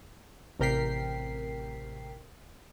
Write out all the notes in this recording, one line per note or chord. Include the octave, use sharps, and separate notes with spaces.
A1 C3 A#4 G5 B6 C7